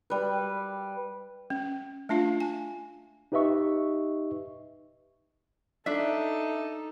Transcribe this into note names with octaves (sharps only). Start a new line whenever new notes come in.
G3 B4
C#4
A3 D4 F4 F5
G#5
D#4 G4 B4 D#5 E5 C#6
D4 D#4 A4 E5